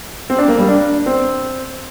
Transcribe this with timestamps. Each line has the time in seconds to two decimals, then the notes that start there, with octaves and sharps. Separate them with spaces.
0.30 C4
0.38 D4
0.48 A#3
0.59 G3
0.68 D4
1.06 C4